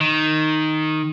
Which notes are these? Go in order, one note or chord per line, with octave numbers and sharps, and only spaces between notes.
D#3